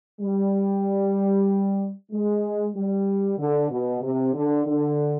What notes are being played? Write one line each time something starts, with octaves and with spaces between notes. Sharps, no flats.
G3
G#3
G3
D3
B2
C3
D3
D3